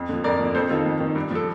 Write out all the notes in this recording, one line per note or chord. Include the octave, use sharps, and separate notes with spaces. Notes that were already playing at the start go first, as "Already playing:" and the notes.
Already playing: F2
D3 F3
F2 A#4 D5
D3 F3
F2 A4 C5
D#3 F4 A4
F2
D#3
G2
F3 A4